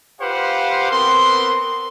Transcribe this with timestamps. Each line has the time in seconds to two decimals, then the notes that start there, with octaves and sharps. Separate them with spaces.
0.21 F4 G4 B4 C5 F5 F#5
0.91 B3 C4 A#4 C6